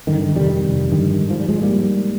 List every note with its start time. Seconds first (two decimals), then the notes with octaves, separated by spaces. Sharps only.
0.07 G2 D3 D#3
0.22 D#3
0.35 F2 C3 D#3 G3
0.63 F2 C3
0.92 G2 D3 D#3 G3
1.21 G#2
1.30 F3
1.40 G3
1.49 G#2 F3 G#3
1.62 G3 A#3
1.77 G#2